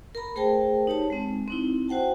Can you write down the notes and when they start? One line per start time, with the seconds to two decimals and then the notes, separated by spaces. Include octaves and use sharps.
0.15 A#4 A#5 B5
0.36 A3 G#4 A#4 C5 G5 A5
0.87 D#4 G4 C#5 A5
1.10 G#3 C4
1.48 C4 D#4 E4
1.88 F#4 C5 F#5 G5 A5